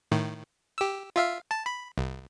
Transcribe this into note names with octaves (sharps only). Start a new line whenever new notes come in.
A2 D#3
G4 E6
F4 E5 F5
A5
B5
C2